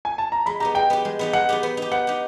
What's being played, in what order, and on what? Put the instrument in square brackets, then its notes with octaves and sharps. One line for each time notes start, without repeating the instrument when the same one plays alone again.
[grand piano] G#5
A5
A#5
[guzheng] G#3 [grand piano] B5
[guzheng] B3 D#4 G4 [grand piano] A#5
[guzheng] G#3 [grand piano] G5
[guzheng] B3 D#4 G4
G#3
B3 D#4 G4
[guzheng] G#3 [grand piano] F#5
[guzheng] B3 D#4 G4
B3
D#4 G4
[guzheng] B3 [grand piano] F#5
[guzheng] D#4 G4